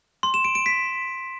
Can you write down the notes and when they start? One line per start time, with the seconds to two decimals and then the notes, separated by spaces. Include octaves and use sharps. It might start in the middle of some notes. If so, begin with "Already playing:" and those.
0.23 C6
0.34 E7
0.45 D7
0.55 D7
0.66 B6